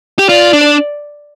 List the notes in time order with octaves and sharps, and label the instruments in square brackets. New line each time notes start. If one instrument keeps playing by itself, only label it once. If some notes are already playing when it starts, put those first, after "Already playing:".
[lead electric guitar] G4
[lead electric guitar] F4 [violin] D5
[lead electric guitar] D4